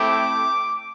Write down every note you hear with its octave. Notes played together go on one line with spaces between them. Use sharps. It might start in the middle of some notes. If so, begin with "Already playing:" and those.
Already playing: A3 C4 E4 G4 D6